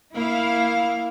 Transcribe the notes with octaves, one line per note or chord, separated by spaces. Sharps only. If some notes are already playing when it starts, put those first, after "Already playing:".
A#3 E4 F5